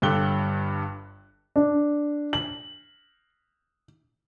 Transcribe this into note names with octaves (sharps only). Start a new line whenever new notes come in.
G1 G2 G4 A4 F#6 G7
D4
F#7